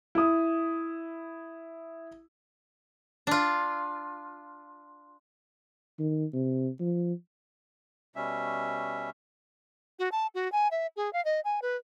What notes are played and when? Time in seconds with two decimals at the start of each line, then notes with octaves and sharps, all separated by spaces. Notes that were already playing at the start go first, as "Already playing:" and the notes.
0.15 E4 D#6
3.27 D4 F4
5.99 D#3
6.33 C3
6.80 F3
8.16 B2 G3 C#4 E5
9.99 F#4
10.12 A5
10.35 F#4
10.52 G#5
10.71 E5
10.96 G#4
11.13 F5
11.25 D#5
11.45 G#5
11.62 B4